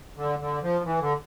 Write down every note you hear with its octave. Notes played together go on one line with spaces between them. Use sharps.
D3
D3
F3
E3
D3